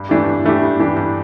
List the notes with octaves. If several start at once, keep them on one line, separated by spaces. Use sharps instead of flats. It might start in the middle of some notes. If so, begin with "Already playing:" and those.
Already playing: G2
E3 A3 D4 G4
G2
E3 A3 D4 G4
G2
E3 A3 D4 G4
G2